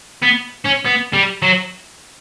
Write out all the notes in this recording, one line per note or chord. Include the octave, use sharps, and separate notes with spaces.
B3
C#4
B3
G3
F#3